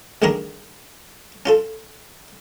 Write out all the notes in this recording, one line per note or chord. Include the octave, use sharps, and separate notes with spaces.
A1 G2 D#3 D4 G#4 A#4
C#4 F4 A4